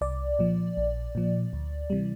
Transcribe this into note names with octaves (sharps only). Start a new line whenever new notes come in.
C2 D5
A#2 F3
A#1
A#2 F3
D2
C3 E3 G3